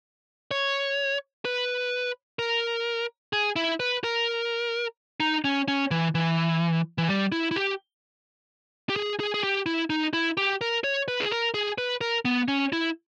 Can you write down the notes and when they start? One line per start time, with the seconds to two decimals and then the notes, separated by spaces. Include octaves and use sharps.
0.51 C#5
1.45 B4
2.39 A#4
3.33 G#4
3.56 E4
3.80 B4
4.04 A#4
5.20 D#4
5.44 C#4
5.68 C#4
5.91 E3
6.15 E3
6.98 E3
7.08 G3
7.32 E4
7.51 E4
7.56 G4
8.90 G4
8.96 G#4
9.20 G#4
9.34 G#4
9.44 G4
9.66 E4
9.90 D#4
10.13 E4
10.37 G4
10.61 A#4
10.84 C#5
11.08 B4
11.21 G#4
11.31 A#4
11.54 G#4
11.78 B4
12.01 A#4
12.25 B3
12.48 C#4
12.72 E4